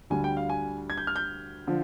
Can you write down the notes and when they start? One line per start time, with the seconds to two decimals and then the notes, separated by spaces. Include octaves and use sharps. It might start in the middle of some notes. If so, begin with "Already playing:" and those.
0.10 D2 D3 G3 G#5
0.24 G5
0.37 F5
0.50 G#5
0.90 G#6
0.97 G6
1.07 F6
1.16 G6
1.67 D3 F3